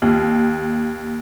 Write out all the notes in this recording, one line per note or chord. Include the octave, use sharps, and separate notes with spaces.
D#2